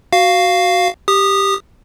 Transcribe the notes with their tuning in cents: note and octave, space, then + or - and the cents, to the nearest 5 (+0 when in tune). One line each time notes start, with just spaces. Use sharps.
F#4 +5 F5 +0
G4 +0 D#6 -15